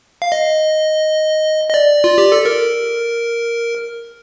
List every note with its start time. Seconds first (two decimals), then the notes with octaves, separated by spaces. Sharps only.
0.22 F5
0.32 D#5
1.69 D#5
1.74 D5
2.04 F4
2.18 G4
2.32 A4
2.45 A#4